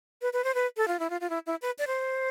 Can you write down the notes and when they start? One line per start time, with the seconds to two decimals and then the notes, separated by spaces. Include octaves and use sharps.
0.22 B4
0.33 B4
0.44 C5
0.55 B4
0.77 A4
0.88 F4
1.00 E4
1.10 F4
1.21 F4
1.30 E4
1.47 E4
1.62 B4
1.79 D5
1.87 C5